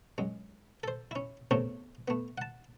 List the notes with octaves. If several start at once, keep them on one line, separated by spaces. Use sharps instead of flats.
F#2 G#3
A4 C5
C#4 E4
E2 A2 C3 A3 C4 C#4
A3 B3
F#5 A5